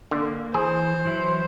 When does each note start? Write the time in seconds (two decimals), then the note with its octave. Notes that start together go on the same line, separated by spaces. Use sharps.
0.11 D3 A#3
0.54 E3 G#4 C5
1.05 E3 F#3 E4